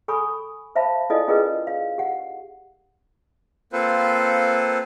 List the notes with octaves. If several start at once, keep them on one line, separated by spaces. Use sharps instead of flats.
A4 G#5 B5 C#6 D#6
C5 E5 F5 A5 B5
D4 E4 F4 A4 D5 D#5
C#4 F4 G#4 A#4 B4 D#5
F5
G4 F#5
A#3 C4 F4 A4 B4 C5